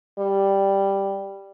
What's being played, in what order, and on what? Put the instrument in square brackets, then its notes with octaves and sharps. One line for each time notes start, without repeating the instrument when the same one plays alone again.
[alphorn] G3